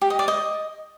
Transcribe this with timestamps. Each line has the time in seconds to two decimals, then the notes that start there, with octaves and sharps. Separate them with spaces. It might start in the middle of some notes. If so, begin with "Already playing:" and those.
0.01 G4
0.10 D#5
0.19 D5
0.28 D#5